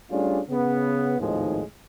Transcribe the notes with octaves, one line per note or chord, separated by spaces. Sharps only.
G3 A3 C#4 D4 F4 G#4
C#3 B3
G#1 D#2 A2 D#3 F3 G#3